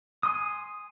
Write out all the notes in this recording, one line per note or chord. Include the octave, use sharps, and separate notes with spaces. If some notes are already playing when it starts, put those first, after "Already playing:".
G#5 C6 D#6